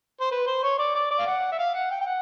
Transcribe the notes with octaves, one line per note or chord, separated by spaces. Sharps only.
C5
B4
C5
C#5
D5
D5
D5
F5
F#5
E5
F5
F#5
G5
G5
F#5